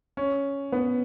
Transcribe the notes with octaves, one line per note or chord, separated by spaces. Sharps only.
C#4
B3